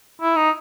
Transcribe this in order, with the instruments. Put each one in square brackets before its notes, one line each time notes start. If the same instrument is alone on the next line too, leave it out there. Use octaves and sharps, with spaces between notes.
[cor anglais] E4
D#4